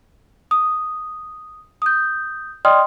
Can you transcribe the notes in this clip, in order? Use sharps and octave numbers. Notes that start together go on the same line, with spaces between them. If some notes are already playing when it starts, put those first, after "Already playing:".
D#6
D#6 G6
D5 D#5 G5 C6 D#6 F6